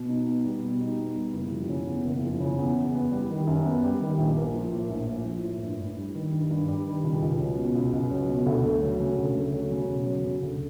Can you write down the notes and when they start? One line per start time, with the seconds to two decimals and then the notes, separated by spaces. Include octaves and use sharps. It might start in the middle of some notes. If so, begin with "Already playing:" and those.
Already playing: B2
0.09 D#4
0.27 B3
0.45 G3
0.63 B2
0.80 D#4
0.99 B3
1.16 G3
1.34 F#1
1.52 F3
1.69 C#3
1.87 E2
2.05 F#1
2.23 F3
2.40 C#3
2.58 E2
2.76 F#2
2.94 B3
3.11 G3
3.30 D#3
3.47 F#2
3.66 B3
3.83 G3
4.01 D#3
4.18 A#1
4.37 A#3
4.54 F3
4.72 A2
4.90 A#1
5.07 A#3
5.25 F3
5.44 A2
5.62 G2
5.79 G2
5.97 G3
6.15 D#3
6.33 G2
6.51 G2
6.68 G3
6.86 D#3
7.04 C#2
7.22 C#2
7.40 F#3
7.58 B2
7.75 C#2
7.93 C#2
8.11 F#3
8.28 B2
8.46 D2
8.64 A3
8.82 F#3
9.00 C#3
9.18 D2
9.35 A3
9.54 F#3
9.71 C#3
9.88 E1
10.06 F#3
10.25 C#3
10.42 D2